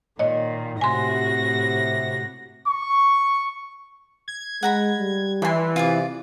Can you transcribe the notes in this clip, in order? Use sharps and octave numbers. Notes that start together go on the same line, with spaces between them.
A#2 D#3 C#5 D#5
A2 C3 F#4 G#5 C6 A#6
C#6
G#6
G#3 F#5 A#5 B5
G3
E3 B5 C6
C3 F4 G#4 D5